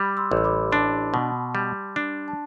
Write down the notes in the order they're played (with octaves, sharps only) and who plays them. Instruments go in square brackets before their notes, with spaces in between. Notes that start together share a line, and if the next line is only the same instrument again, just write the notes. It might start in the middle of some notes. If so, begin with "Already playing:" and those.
Already playing: [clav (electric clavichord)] G3 [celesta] B5 D6
[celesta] C6 E6
[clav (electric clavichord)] A1
[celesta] E6
B5 D6
[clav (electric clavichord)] D4 [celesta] A5 C6
[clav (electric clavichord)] B2
G3
D4
[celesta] A5